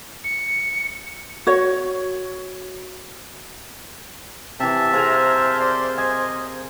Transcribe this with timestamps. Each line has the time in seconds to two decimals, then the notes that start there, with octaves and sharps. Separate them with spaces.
0.24 C#7
1.47 F#4 C#5
4.60 C3 E3 E5 A5
4.93 G#4 A#4 C5 F5
5.60 D5 C6
5.98 D#5 G#5